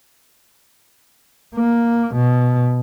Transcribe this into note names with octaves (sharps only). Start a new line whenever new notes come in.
A#3
B2